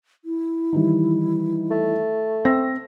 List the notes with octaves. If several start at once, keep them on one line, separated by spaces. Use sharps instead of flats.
E4
D#3 E3 G3
A3
C4 G5 E6 A#6